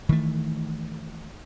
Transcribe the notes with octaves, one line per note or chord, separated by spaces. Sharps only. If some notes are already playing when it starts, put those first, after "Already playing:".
D#3 E3 A3